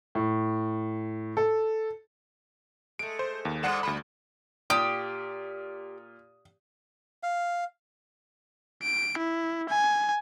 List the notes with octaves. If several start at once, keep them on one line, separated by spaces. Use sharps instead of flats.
A2
A4
G#3 A3 D7
C5
D#2
G#2 G3 D5 F#5 E7
D2 G3 B5
A#2 G4 D#6
F5
D7
E4
G#5